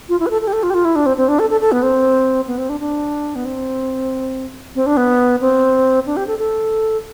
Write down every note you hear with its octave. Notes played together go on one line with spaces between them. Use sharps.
F4
E4
B4
A4
A4
G4
A4
F4
G4
F4
E4
D4
C4
C4
D4
A4
A4
A4
B3
C4
B3
C4
D4
D4
B3
C4
C4
D4
B3
C4
D4
G4
A4
A4